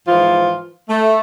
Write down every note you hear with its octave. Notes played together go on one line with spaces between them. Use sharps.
G#2 E3 F3 F4
A3